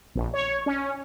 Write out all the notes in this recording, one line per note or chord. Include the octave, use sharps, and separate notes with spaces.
A#1
C#5
C#4